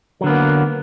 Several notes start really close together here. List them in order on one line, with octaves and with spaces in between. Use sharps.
F#3 D3 B3 A#3